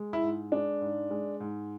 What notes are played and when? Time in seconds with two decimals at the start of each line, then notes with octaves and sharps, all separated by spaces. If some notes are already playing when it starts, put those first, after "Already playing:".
Already playing: G#3
0.13 E4
0.23 G#2
0.52 G#3 D4
0.81 G#2
1.11 G#3
1.40 G#2